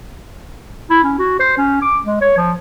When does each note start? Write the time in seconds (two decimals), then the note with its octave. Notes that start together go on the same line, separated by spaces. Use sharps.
0.90 E4
1.03 C#4
1.19 F#4
1.39 C5
1.57 C#4
1.82 D6
2.05 G#3
2.21 C#5
2.37 F3